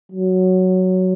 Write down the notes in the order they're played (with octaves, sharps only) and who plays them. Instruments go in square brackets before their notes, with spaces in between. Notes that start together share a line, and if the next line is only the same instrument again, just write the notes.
[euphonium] F#3